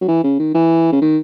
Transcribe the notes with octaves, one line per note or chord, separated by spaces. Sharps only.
F#3
E3
C#3
D#3
E3
C#3
D#3